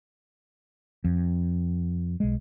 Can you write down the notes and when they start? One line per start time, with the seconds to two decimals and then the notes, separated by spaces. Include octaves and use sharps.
1.04 F2
2.20 B1 G#3